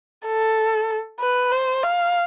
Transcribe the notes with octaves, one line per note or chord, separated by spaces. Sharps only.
A4
B4
C5
F5